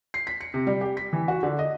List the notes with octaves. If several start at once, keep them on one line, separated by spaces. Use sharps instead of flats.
C7
B6
C#7
C3
G3
G4
B6
E3
F#4
D3
D#5